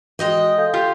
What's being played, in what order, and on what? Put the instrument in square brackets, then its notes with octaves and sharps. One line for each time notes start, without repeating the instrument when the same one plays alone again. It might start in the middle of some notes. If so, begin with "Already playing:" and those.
[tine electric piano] E3 F#4 [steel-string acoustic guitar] G#3 D#5 G5
[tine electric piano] A4 F5 G6
[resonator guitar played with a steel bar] F4 G4